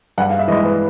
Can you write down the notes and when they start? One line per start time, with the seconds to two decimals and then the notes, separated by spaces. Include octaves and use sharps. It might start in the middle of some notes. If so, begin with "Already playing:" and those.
0.18 G2 F#5
0.30 F5
0.39 E5
0.48 E3 D#5
0.52 G#3
0.64 B4